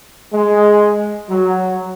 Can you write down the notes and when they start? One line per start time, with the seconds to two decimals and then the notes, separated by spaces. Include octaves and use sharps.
0.33 G#3
1.29 F#3